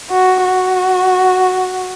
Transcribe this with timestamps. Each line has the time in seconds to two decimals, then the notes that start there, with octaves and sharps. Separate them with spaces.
0.10 F#4
0.45 F#4